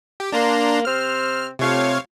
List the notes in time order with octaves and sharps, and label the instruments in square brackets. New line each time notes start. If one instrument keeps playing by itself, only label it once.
[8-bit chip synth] G4
[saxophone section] A#3 [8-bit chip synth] D4 A#5 C6
[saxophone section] C3 C4 C5 [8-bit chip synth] F6
[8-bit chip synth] C3 C#5 F5 [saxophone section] A3 F4